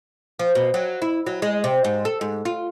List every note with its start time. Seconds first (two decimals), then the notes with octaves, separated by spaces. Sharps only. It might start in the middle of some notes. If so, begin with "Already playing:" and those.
0.39 F3
0.55 B2
0.74 F#3
1.02 E4
1.26 F#3
1.42 G#3
1.64 C3
1.84 G#2
2.05 A4
2.21 G#2
2.45 F4